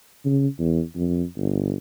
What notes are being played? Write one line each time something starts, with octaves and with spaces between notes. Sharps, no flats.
C#3
E2
F2
G1